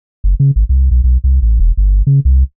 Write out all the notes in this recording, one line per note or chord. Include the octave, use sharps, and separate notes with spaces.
F#1
C#3
G#1
C2
B1
B1
C2
A1
E1
G1
C#3
C2